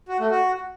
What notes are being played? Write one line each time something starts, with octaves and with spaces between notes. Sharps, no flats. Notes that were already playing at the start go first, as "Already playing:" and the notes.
F#4
A3
F#4